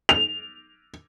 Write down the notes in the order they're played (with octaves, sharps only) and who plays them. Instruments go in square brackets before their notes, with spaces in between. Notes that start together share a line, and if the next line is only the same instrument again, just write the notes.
[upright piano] F7